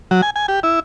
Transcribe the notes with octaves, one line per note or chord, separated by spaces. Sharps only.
F#3
G#5
G#5
G4
E4